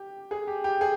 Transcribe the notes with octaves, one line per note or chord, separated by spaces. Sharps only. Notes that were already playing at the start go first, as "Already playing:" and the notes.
Already playing: G4
G#4
G4
G4
G#4